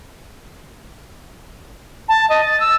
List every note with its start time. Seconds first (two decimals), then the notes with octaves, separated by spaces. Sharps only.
2.09 A5
2.30 D#5
2.45 A6
2.60 E6